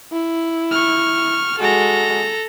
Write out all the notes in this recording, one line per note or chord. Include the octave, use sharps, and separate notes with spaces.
E4
C#6 F6
G#3 F#4 A4 A#5